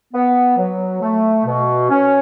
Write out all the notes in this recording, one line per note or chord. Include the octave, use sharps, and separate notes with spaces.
B3
F#3
A3
B2
C#4